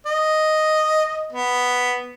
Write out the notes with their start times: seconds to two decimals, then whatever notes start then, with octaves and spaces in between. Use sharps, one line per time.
0.06 D#5
1.32 B3